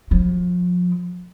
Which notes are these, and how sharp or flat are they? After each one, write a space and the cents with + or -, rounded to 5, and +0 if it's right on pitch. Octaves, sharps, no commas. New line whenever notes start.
F3 +35